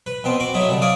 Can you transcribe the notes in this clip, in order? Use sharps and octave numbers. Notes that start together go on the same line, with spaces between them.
B4
B2 B3 C4
F#4 D6
F#3 A3 D#4 E4
C2 D3
C#5 D5 F5 D6 D#6